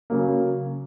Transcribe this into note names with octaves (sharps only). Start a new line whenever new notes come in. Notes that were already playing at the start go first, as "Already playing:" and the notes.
C#3 F#3 A#3